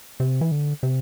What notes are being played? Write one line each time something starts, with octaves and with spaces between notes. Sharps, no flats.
C3
E3
D3
C3